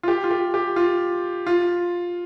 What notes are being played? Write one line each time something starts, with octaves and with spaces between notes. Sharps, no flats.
F4
G4
F4
G4
G4
F4
F4